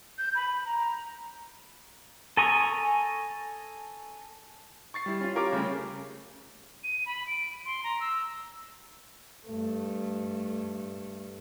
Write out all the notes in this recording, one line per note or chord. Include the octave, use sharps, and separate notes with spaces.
G6
B5
A#5
A4 G#5 A#5 C#6 D#6
C#6 A6 C7
G3 E4
C#4 F4
F4 G4 A#4 C#5 F5 D6
C#3 G3 A3 C#4
D#7
B5
D7
C6
A#5
E6
G2 A3